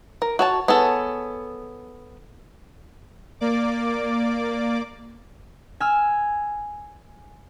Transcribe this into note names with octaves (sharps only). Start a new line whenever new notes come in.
A#4
F#4 C#5 A5
B3 G#4 A4 C#5
A#3 D5 D6
G#5 E6 F6